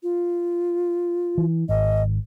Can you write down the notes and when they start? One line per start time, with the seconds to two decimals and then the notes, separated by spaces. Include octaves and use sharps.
0.03 F4
1.38 E3
1.69 G#1 D#5